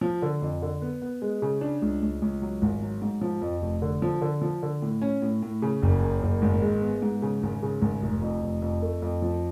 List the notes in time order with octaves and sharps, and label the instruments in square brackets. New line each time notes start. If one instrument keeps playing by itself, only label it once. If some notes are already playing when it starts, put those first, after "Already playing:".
[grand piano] F3
D3
F2
D3
B3
B3
G#3
C#3
D4
C#2
C#2
C#2
F#3
G#1
F#3
G#2
F3
F2
F1
D3
F3
D3
F3
D3
A2
C#4
A2
A2
C#3
F#1
F#2
F#1
G#1
G#3
B3
G#2
C#3
G#1
C#3
G#1
F1
F2
F1
F2
A3
F2
F3